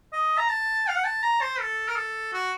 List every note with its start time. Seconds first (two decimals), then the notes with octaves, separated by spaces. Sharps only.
0.13 D#5
0.38 A#5
0.49 A5
0.88 F5
0.96 F#5
1.04 A5
1.23 A#5
1.42 C5
1.60 A4
1.89 A#4
1.96 A4
2.33 F#4